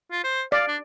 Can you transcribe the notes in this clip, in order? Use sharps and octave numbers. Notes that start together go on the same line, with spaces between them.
F4
C5
D5 F5
D4